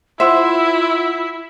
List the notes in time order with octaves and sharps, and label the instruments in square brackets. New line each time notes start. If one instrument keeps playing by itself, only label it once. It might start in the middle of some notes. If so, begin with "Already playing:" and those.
[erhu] E4 [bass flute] F4 [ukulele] C5 [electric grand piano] E5 F#5 E6